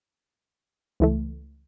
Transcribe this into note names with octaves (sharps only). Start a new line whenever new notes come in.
C#2 E3 A3